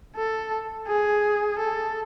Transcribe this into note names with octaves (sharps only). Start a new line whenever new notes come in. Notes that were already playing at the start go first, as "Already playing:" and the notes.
A4
G#4
A4